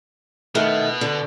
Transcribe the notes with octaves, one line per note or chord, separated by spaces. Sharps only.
B2 D#3 A3 B3
D3